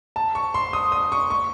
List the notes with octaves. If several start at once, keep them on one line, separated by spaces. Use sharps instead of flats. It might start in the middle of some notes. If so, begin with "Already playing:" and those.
A5
C#6
C6
D#6
D#6
C#6
C#6